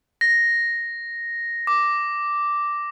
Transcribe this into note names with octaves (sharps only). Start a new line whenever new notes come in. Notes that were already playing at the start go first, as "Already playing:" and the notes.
A#6
D6